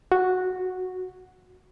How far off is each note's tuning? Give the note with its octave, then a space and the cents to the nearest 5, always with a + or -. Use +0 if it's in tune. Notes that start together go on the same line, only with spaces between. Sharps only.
F#4 -5